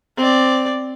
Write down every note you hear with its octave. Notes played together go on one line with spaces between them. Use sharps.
C4 D5